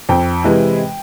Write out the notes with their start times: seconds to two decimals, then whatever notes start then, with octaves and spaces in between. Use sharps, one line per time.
0.09 F2 G5
0.44 C3 E3 G#3 E4